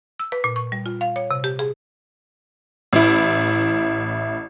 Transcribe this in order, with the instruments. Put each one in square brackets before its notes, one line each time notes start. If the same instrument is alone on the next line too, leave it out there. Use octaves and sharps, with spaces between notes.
[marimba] E6
B4
A#2
C#6
G3
F4
F5
C#5
C3
G4
G#4
[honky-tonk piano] A1 E4